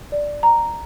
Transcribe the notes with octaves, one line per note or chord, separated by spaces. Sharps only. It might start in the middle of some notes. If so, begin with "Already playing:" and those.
D5
A#5